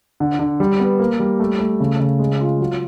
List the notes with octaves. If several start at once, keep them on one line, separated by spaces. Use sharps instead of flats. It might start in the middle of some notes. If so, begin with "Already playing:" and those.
D3
D3
G3
B3
A#3
G3
A3
A3
C#3
C#3
G#3
F4
F#3